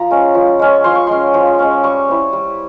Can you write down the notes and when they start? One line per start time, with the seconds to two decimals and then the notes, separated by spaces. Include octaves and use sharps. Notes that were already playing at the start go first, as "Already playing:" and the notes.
Already playing: F3 A#5
0.11 G#3 C#4
0.34 F3
0.59 G#3 C#4
0.84 F3 C6
0.95 C#6
1.07 G#3 C#4 C6
1.34 F3
1.59 G#3 C#4
1.83 G3 C#6
2.08 C4 E4
2.33 G3